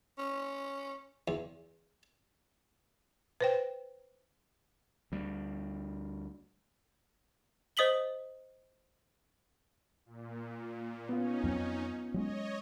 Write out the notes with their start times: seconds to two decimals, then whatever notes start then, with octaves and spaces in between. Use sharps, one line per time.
0.18 C#4
1.28 E2
3.41 B4 C5 G5
5.12 D2 G3
7.77 C5 D#5 D#6 B6 F#7 G7
10.06 A#2
11.09 B3 C#4 D#4 F4
11.44 F2 F#3 C4
12.14 F#3 G#3 C#4 C#5 D#5